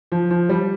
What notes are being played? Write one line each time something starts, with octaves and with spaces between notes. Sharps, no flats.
F3
F3
G3